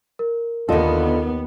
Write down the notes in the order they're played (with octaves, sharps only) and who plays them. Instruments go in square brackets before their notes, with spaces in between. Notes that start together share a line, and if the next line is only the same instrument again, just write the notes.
[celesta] A#4
[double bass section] D#2 B3 [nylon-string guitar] D3 A4 [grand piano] F4 D#5